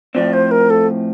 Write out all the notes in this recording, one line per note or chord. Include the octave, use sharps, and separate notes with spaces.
A2 F3 C4 D5
C5
A#4
A4